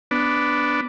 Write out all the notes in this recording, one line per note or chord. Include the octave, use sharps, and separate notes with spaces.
B3 D4